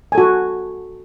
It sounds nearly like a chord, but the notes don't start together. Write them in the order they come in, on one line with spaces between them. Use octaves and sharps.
G#5 A4 F#4